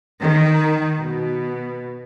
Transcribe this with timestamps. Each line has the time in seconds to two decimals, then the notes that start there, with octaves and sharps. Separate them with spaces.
0.21 D#3
1.00 B2